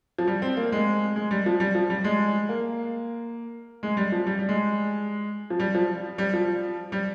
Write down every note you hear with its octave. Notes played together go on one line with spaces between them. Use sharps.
F3
G3
C4
A#3
G#3
G#3
G3
F3
G3
F3
G3
G#3
A#3
G#3
G3
F3
G3
G3
G#3
F3
G3
F3
G3
F3
G3